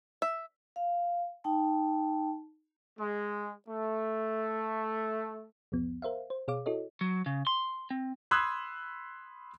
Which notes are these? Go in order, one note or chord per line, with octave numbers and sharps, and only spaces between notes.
E5
F5
D#4 G5 A5
G#3
A3
B1 E2 F3 B3
A#4 C5 E5 F5
C5
B2 G#4 C#5 F5 D6
E4 F#4 A4 C#5 D#5
F#3
C#3
C6
C4
B5 C6 D#6 E6 F#6 G#6